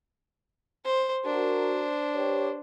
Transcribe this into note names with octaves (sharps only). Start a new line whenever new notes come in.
C5
D4 F#4 A#4 C5
G4 B4 C#5